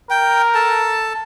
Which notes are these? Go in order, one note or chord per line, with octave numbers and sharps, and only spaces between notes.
A#4 G5
A4 A5